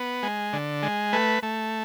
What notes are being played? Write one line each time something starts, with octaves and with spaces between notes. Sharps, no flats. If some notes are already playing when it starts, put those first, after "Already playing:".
Already playing: B3
G#3
D3
G#3
A3 B4
A3